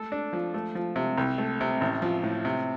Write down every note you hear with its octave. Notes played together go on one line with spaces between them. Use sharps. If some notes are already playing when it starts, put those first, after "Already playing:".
Already playing: A3 A4
D4
F3
A3
F3
C3
C2
A3
C3
A1
F3
A2
C3